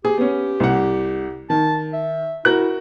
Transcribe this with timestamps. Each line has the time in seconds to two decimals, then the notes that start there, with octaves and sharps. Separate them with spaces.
0.05 G4 G#4
0.18 B3 C#4
0.60 C2 F#5
1.50 D#3 A5
1.93 E5
2.45 E4 F#4 A#4 F#6